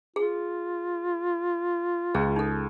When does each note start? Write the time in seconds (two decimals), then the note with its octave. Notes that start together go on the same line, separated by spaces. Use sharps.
0.16 F4 G#4
2.15 C#2 G#4
2.36 D#4 A4